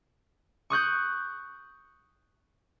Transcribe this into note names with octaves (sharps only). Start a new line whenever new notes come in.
C#6 D#6 F#6 G6